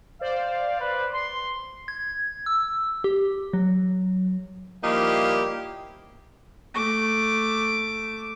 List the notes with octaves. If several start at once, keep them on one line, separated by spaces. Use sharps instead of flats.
C5 D5 F5
B4
C6
G#6
E6
G4
F#3
F3 G3 A#3 D#4 E4 G4
A3 D6